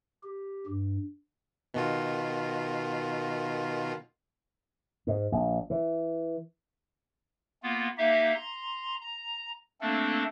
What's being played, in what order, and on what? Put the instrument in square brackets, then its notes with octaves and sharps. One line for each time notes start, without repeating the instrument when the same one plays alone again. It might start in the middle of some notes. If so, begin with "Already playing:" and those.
[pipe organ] G4
G2
[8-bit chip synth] B2 D#3 F4
[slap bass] G#2
A#1
E3
[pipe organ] A#3 B3 F4
A#3 D#4 G4 E5 F5
A#5 C6
A#5
A3 A#3 C4 D4 A4